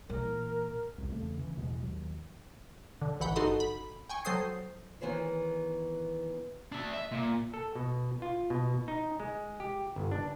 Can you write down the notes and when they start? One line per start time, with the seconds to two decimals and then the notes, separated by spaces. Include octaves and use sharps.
0.10 A#2 E3 A#4
0.98 C2 F2
1.12 E2 C#3 A3
1.38 C#3 E3
1.56 A1 E2 B2 G#3
1.80 D#2 F#3
3.02 D3
3.20 A1 E3 F#5 B5 G6
3.36 G1 D#4 F#4 A4 C6 D#6
3.60 B5
4.09 G5 G#5 C#6
4.25 F#3 A4 C5 D#6 C7
5.01 D#3 E3 B3 G#4 C5 C#5
6.72 D4 E5
6.93 E5
7.12 A#2
7.54 A4
7.75 B2
8.22 F4
8.50 B2
8.88 D#4
9.20 G#3
9.60 G4
9.96 G1
10.11 D4